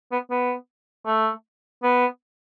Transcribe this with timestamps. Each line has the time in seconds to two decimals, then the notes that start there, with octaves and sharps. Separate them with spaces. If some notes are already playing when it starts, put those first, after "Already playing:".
0.12 B3
0.30 B3
1.06 A3
1.83 B3